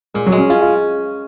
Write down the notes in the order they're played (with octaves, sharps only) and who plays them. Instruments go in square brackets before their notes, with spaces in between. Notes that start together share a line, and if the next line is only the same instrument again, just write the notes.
[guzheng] A#2 [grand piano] G#3
[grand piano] F#3
[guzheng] G#3
[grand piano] C#4
[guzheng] C#4 [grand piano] F4
[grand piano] F4